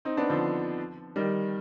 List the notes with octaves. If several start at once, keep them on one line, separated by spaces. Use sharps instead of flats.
C4 D#4
B3 D4
D3 F3
D#3 G3